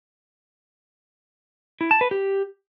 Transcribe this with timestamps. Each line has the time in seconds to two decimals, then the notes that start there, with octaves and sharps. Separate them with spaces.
1.81 E4
1.91 A5
2.01 B4
2.11 G4